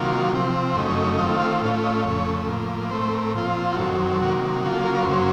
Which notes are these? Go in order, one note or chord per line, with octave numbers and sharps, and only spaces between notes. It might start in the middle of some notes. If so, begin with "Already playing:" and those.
Already playing: C3 D#3 F#3 A#3 F4
C3 F3 C4
F#2 C#3 A3 D#4 C5
C#5
C#5
D#3 A3 C4 F4 D#5
F5
A2 A3 C#4 F4 F5
D#5
F2 C#3 A3 C#5
A2 F3 A#3
A2 A3 C4 C5
C5
A#4
A#2 F3 C4 F4
F#4
F#2 D#3 F#3 C4 A4
A4
C3 D#3 F#3 A#3 F#4
C#3 F#3 A#3 F4 F#4
A4
A#4
A#4
C#5
F#2 C#3 F#3 A#3 C5